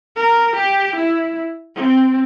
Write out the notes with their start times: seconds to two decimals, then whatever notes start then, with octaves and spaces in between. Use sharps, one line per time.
0.16 A#4
0.56 G4
0.96 E4
1.76 C4